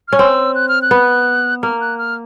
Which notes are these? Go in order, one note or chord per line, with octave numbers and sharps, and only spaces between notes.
C#4 F6
C4 E6
F#6
F6
F#6
B3
A#3 F6
F#6
F6